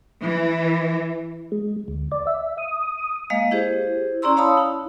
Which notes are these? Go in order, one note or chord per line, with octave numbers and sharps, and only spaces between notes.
E3
G#3
D2
D5
E5
D#6
G#3 A#3 D#5 F5
E4 G4 G#4 C5
C#4 E4 D5 A#5 C6 E6
C#5 F5 A5 B5 D#6 E6
E4